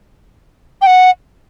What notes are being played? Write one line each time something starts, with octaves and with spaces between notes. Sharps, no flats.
G5
F#5